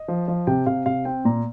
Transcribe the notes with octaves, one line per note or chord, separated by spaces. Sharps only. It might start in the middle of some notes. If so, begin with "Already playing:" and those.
Already playing: D#5
F3
F3
C3 G5
C3 F5
C3 F5
C4 G5
A#2 A#5